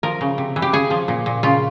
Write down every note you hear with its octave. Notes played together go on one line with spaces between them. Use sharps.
F3 A#4
C#3
C3
E3
G4
C#3 G#4
F3
A#2
A#2
C#3 F4